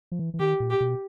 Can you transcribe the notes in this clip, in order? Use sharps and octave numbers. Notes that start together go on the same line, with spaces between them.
F3
E3
E3
D#3 G4
A#2
G4
B2